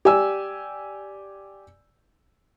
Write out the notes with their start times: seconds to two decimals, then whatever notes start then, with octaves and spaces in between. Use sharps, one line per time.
0.05 G4 D5 G#5 E6